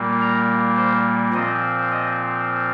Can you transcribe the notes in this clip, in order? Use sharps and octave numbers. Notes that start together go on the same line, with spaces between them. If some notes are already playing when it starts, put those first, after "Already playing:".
Already playing: A#2 G3 A#3
A#5
C5
A#2 F3 C4 D#5
D#5